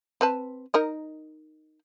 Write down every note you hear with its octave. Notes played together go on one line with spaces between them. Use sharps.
C4 B4 A5
D#4 A#4 D#5